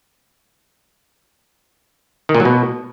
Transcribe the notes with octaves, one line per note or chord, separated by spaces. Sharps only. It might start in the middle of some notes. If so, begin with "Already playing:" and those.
D#3
A#2
F#3
B2